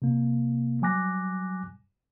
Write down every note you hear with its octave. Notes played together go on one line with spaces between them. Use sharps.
C3 A#3
F#3 G3 G#5 D6 F#6 A#6